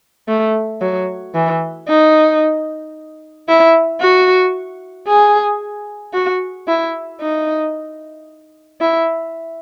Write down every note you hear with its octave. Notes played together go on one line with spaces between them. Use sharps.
A3
F#3
E3
D#4
E4
F#4
G#4
F#4
E4
D#4
E4